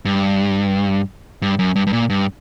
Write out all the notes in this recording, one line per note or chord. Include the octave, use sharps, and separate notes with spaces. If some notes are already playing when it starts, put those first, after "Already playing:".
G2
G2
F#2
G2
G2
A#2
G2